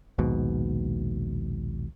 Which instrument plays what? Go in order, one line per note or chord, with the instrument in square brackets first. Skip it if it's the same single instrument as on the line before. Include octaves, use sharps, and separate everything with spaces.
[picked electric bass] A#1 D#2 G#2 B2